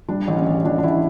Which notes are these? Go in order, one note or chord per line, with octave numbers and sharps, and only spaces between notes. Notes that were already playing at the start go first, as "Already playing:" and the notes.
G3 D4
A1
C#4
A1
A1 D4
D4
A1 E4